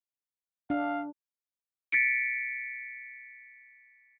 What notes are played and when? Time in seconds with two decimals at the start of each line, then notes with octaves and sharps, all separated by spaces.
0.70 D4 F5
1.92 A6 B6 C#7 D7